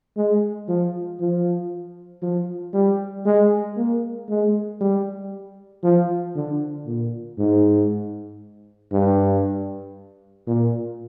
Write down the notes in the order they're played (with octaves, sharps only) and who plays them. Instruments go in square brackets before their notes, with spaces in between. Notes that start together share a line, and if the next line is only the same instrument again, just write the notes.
[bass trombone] G#3
F3
F3
F3
G3
G#3
A#3
G#3
G3
F3
D3
A#2
G#2
G2
A#2